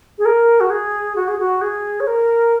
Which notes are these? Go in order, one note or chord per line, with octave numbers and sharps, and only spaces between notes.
G#4
A#4
F#4
G#4
F#4
G#4
F#4
G#4
C#5
A#4